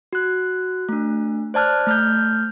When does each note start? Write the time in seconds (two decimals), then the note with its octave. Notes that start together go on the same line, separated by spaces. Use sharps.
0.13 F#4 F#6
0.89 A3 D4
1.54 C5 D5 A5 F6 F#6
1.86 A3 F6 G6